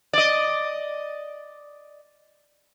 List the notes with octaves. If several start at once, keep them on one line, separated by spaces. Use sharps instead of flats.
D5 D#5